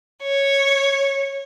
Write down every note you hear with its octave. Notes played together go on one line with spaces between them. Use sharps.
C#5